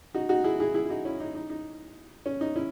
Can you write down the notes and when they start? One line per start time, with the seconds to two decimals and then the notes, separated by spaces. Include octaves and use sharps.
0.14 D#4 F#4
0.29 D#4 F#4
0.44 E4 G#4
0.60 E4 G#4
0.74 E4 G#4
0.85 E4
0.90 D#4 F#4
1.05 C#4 E4
1.20 D#4
1.35 D#4
1.50 D#4
2.26 C#4
2.41 D#4
2.56 C#4 E4